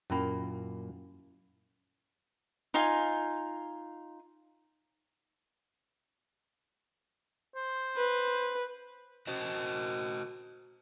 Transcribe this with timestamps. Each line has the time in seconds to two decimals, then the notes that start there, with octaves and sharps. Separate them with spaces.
0.10 F#2 A#2 A#3 C#4 E4 B5
2.74 D#4 F4 G#5
7.56 C5
7.96 B4
9.27 F#4 C5 D#5